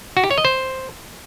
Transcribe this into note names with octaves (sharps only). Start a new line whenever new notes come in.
F#4
G4
C#5
D#5
C5